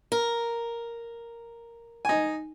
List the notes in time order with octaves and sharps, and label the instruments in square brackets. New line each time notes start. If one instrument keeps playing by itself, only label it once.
[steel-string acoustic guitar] A#4
[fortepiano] D#4 G#5